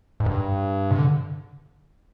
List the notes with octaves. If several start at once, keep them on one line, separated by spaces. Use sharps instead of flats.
G#2
G2
C3
D3